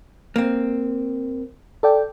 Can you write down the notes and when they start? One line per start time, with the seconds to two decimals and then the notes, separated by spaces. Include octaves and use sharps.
0.36 A#3 C4
1.83 A4 D5 G5